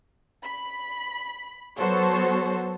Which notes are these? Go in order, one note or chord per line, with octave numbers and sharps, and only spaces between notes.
B5
F#3 B3 F#4 A4 C5 C#5